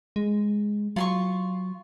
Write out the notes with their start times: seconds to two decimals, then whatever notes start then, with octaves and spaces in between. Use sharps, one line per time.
0.16 G#3
0.96 F#3 F4 C6 C#6